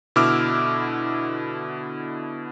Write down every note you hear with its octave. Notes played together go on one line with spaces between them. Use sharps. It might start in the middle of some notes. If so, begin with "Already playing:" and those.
B2 D3 E4 D6 E6 F6